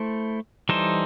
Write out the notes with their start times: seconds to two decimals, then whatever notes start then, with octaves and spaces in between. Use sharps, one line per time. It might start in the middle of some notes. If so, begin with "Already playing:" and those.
Already playing: A3 E4 A4 C5
0.69 E3 G3 D#4 A4 C5